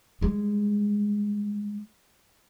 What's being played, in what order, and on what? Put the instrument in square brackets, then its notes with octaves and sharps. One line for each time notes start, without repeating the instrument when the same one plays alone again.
[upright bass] G3 G#3